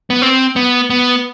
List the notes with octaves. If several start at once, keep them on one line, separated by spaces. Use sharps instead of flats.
B3
C4
B3
B3